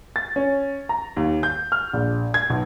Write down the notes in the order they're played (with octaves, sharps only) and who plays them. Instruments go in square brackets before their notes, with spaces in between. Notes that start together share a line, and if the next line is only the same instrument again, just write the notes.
[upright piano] A6
C#4
A#5
D#2
G6
F6
A#1
G#6
B1